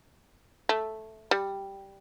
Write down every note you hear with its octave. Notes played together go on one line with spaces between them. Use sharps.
A3
G3